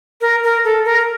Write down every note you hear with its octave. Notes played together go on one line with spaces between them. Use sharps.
A#4
A#4
A4
A#4